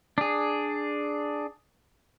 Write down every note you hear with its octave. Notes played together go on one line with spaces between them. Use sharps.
D4 G#4